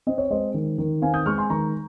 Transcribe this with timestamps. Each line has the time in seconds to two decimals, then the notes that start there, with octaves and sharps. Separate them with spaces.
0.07 C4 D#5
0.18 C#5
0.30 G#3 C5 D#5
0.54 D#3
0.78 D#3
1.02 C4 F5 G#5
1.14 D#6 G6
1.26 G#3 C#6 F6
1.38 G#5 C6
1.50 D#3 A#5 C#6